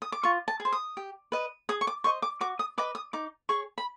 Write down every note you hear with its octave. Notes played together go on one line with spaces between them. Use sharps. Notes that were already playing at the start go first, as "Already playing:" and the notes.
D#6
D6
F4 C#6
A5
G#4
C5
D#6
G4
B4 D#5
G#4 D#6
C#6
D6
C5 D#5 C#6
D6
F#4 D6
D#6
B4 D#5 D6
D#6
D#4 D6
G#4 C#5 C#6
B5